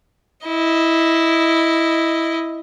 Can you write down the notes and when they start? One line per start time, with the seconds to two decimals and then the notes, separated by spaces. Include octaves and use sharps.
0.47 E4 D#5